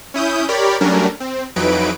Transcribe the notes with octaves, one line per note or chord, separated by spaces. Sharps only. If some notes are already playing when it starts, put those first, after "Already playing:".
C#4 E4 D#6 G6
G4 A#4 C#5 D5 B5
F#3 G3 A3 C#4 D4 A#4
C4
F2 E3 F#3 D#4 B4 D7